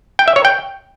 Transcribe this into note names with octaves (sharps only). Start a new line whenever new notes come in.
G5
E5
C#5
G5